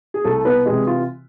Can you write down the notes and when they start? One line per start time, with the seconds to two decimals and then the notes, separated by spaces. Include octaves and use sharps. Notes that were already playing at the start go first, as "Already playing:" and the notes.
0.14 G#4
0.24 C2 A3 A4
0.45 B3 B4
0.66 C3 E3 G#3 G#4
0.87 F4